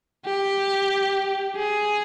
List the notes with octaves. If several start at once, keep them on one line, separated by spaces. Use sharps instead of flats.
G4
G#4